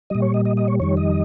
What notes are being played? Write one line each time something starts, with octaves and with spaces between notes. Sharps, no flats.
A#2 G3 D#5
C#5
D#5
D#5
D#5
C#5
F2 D#3 G3 C#5
D#5